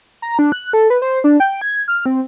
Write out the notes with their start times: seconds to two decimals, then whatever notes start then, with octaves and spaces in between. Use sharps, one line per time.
0.22 A#5
0.39 D4
0.52 F#6
0.73 A4
0.90 B4
1.02 C5
1.24 D4
1.40 G5
1.61 G#6
1.88 F6
2.06 C4